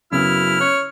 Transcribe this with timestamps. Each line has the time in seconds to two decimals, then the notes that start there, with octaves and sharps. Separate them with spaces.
0.12 F#2 C#3 B3 E4 G#4 F6
0.61 C#5 F#6